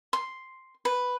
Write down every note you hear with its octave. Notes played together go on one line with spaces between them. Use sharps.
C6
B4